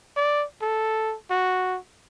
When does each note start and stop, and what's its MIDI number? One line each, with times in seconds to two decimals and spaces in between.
0.17 0.45 74
0.62 1.15 69
1.30 1.78 66